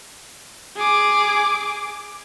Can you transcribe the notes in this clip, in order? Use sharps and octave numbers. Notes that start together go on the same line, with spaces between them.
G#4 D6